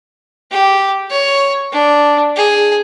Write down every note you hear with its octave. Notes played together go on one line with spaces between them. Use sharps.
G4
C#5
D4
G#4